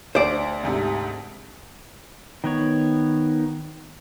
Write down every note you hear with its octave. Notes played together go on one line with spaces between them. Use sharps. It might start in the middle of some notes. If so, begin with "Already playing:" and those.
D2 C5 D5
D2 G#2 C3
D#3 B3 C#5